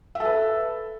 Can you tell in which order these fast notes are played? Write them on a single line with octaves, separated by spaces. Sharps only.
E5 A4 B4